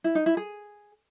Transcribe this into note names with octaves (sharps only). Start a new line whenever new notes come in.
E4
D#4
E4
G#4